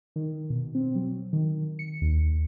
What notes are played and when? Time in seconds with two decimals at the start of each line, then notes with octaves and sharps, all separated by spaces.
0.16 D#3
0.50 B2
0.75 C4
0.95 F#3
1.33 D#3
1.79 C#7
2.02 D#2